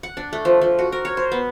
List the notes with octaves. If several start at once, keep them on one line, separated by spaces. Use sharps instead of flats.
F#5
D4
A3
F3
F3
F#4
A#4
C#5
C5
B3